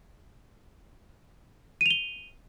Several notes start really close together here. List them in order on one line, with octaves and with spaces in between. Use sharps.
D#7 F7 G7